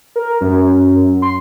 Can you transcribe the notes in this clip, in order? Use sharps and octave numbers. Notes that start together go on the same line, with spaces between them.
A#4
F#2
C6